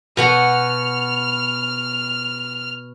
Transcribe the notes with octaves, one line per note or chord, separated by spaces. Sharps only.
B2 B3 F#5 F6